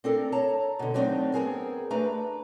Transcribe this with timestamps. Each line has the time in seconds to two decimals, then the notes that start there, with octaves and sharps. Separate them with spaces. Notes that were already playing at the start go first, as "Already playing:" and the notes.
0.04 C4 D4 A4 A#4
0.32 C#5 A5 A#5
0.79 B2 D3
0.94 F#3 G3 A3 C4 D4 D#4
1.34 B3 C4 G#4 A#4
1.90 A3 D4 B4 A#5